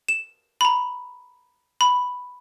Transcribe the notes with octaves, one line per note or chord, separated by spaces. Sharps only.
E7
A#5 B5
B5